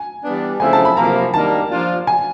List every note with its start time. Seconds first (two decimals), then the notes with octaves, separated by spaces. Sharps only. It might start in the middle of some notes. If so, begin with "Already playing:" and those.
Already playing: G#5
0.24 E3 G3 B3 D4
0.60 C#3 F3 A3 C4 E4 G#5
0.73 A5
0.85 B5
0.97 C3 F3 A#3 A#5
1.34 D#3 G3 A#3 D4 A5
1.70 F3 A#3 D4 F4
2.07 G#5